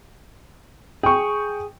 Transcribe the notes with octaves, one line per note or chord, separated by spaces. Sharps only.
G#4 G5 C#6